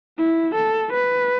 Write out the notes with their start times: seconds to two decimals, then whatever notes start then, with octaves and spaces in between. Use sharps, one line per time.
0.18 E4
0.55 A4
0.92 B4